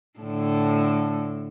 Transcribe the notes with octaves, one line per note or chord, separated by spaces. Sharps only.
A2 D3